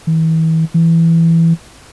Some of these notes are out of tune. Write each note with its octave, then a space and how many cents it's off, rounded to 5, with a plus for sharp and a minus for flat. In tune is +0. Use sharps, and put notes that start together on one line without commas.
E3 -40
E3 +5